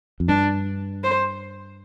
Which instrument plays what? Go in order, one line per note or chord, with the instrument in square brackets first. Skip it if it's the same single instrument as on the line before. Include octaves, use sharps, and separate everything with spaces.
[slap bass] F2
[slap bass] G2 [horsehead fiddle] D4
[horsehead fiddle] C5